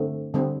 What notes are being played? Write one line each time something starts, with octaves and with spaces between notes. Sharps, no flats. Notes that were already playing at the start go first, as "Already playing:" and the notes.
Already playing: D3 A3 C4
D3 G3 C4